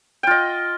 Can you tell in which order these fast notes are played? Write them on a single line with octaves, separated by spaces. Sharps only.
G5 F4 D#5